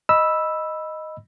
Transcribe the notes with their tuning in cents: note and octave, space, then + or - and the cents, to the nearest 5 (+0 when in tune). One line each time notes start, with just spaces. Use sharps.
D#5 +0 B5 -10 E6 +0